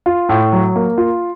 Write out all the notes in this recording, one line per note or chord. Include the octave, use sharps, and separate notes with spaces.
F4
A2
F#3
A#3
F4